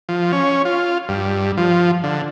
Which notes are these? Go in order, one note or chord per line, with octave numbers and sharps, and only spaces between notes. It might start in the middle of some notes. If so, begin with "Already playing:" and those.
F3
C#4
F4
G2
F3
D3